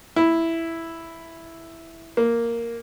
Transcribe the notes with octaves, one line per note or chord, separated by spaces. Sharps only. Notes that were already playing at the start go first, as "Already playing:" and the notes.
E4
A#3